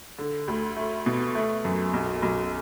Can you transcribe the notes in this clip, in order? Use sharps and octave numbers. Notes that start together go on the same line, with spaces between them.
D3
D2
A3
B2
A3
F#2
B1
B1